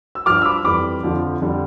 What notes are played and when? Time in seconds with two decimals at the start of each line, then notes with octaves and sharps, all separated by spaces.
0.15 E6
0.26 F3 D6 F6
0.30 G2
0.42 E6
0.45 B5 D6
0.64 F2 E3 G3 B5 D6
1.03 F2 D3 F3
1.41 F2 D3 G3